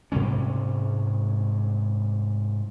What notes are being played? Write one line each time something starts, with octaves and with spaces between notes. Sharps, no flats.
G#2 C3 G3 C#4